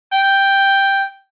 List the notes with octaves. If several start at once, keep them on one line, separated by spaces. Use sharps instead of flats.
G5